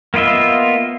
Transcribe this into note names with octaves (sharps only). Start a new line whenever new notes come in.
A#3 B3 F4 D#5 E5